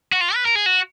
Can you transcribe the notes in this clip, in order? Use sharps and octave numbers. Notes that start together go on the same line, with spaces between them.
F#4
F4
B4
A#4
G#4
F#4